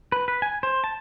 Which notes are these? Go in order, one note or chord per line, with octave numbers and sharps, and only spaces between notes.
B4
B4
G#5
C5
A5